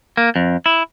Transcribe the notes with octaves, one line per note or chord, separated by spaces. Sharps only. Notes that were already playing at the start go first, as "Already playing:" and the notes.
A#3
F2
E4